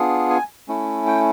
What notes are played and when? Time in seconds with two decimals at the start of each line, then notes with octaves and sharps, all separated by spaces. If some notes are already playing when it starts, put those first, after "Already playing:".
Already playing: B3 D4 F4 G#4
0.30 G#5
0.68 A3 C#4 E4
1.07 G5